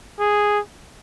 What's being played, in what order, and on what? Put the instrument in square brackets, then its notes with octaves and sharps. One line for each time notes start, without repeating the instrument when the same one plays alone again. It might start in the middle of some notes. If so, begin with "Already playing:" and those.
[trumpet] G#4